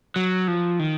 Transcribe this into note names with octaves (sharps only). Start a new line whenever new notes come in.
F#3
F3
D#3